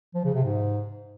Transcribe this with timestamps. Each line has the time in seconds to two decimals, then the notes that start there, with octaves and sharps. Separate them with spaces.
0.15 F3
0.25 C#3
0.34 C3
0.44 G#2